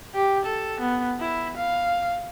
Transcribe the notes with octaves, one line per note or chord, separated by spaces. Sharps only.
G4
A4
B3
E4
F5